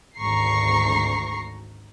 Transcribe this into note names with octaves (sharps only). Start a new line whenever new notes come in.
G#1 D2 A#5 C#6 C7